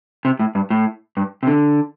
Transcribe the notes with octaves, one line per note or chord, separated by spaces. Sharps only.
C3
A2
G2
A2
G2
C3
D3